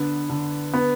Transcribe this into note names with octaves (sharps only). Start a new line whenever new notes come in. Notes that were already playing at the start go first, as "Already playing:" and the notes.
Already playing: D3 B3
D3
B3